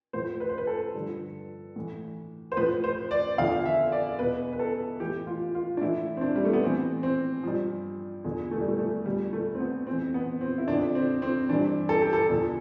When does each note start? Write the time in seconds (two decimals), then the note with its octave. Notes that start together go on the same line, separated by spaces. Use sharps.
0.13 A2 F3 C5
0.40 B4
0.49 C5
0.58 B4
0.67 A4
0.95 G2 D3 F3
1.76 A2 E3
2.52 C5
2.57 A2 F3 B4
2.84 C5
3.11 D5
3.38 E2 D3 F3 F5
3.65 E5
3.92 D5
4.19 E2 B2 B4
4.53 B4
4.59 A4
5.00 A2 E3 G4
5.27 F4
5.55 F4
5.77 D4
5.81 A2 E3 E4
6.17 C4
6.21 D4
6.36 G3
6.45 A3
6.53 B3
6.63 A2 E3 C4
7.03 C4
7.43 G2 F3
8.24 E2 D3 F3
8.51 A3
8.60 G3
8.68 A3
8.79 A3
9.06 E2 D3 F3 G3
9.33 A3
9.55 C4
9.60 B3
9.87 F2 E3 C4
10.14 B3
10.41 C4
10.58 E4
10.68 F2 D3 F3 D4
10.95 C4
11.22 C4
11.49 G2 E3 D4
11.89 A4
12.02 G4
12.13 A4
12.29 E2 D3 F3